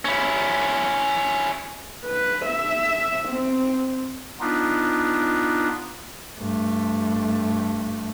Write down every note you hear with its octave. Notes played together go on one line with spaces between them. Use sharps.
C#4 E4
B4
E5
C4
B3 D4 D#4 F4
G2 A3